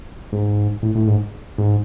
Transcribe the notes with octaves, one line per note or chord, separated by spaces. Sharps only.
G#2
A2
A2
G#2
G#2